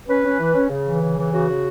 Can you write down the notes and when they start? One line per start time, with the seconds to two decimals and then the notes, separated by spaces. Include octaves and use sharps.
0.08 C#4 B4
0.24 C#4
0.39 E3
0.55 C#4
0.70 C#3
0.86 E3
1.02 C#3
1.17 E3
1.32 C#3 F#4
1.48 C#3